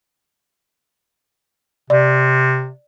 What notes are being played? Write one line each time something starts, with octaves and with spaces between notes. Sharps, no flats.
C3 D5